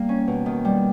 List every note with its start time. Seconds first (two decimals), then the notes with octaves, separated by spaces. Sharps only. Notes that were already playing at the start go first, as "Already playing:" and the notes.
Already playing: G3 A#3
0.09 C#4
0.27 B2
0.46 D#3
0.65 G3